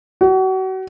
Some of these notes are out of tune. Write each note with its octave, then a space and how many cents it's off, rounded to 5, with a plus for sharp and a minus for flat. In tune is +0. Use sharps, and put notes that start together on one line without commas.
F#4 +35